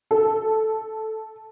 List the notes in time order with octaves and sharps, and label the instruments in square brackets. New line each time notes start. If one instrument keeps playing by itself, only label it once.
[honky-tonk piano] A4